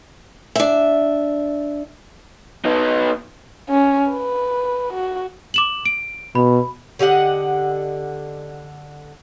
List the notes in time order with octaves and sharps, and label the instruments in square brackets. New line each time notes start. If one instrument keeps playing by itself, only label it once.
[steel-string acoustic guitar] D4 E5
[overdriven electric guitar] B3 D#4
[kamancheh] C#4
B4
F#4
[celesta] D6 E7 F#7
D7
[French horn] B2 [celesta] B5
[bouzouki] D3 G4 D#5 F#5